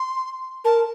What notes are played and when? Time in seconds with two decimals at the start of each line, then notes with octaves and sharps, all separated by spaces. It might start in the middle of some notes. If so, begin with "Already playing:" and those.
Already playing: C6
0.65 A#4 A5